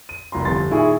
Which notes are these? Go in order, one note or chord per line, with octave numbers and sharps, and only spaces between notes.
D#7
F1 C2 A#5 C6
G1 F2 G4 C6 A6
A#2 D#3 E4 F4 G#4 C#6